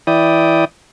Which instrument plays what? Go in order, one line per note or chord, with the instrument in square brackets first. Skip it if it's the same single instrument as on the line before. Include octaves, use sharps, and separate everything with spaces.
[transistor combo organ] E3 E4 D5 G5 D#6